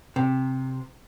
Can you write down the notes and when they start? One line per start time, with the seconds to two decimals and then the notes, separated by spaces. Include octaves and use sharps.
0.16 C3